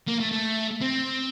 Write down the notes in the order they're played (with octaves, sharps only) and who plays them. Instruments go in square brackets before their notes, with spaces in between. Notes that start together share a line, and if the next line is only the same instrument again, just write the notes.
[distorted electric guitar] A#3
A3
A3
C4